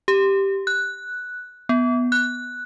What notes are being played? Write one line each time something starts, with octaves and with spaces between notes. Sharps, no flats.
G4
F#6
B3
F#6